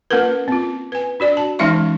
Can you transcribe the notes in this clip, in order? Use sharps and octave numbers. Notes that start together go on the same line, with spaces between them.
A#3 C#4 F4 A#4 B4
C4 F4
B4 G#5
D4 F#4 D5
A5
E3 G#3 C#4 D#4 E5 C#6